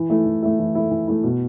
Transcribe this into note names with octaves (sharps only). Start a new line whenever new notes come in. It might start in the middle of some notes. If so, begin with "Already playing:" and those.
Already playing: E3
A3 E4
E3
A3 E4
E3
A3 E4
E3
A3 E4
B2